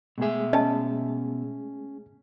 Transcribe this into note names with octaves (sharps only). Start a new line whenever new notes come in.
B2 G#3 A3 G#4 E5
C#4 D#5 A5